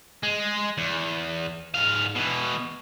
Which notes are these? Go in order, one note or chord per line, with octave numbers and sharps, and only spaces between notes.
G#3
E2
G#2 F5
B2 E3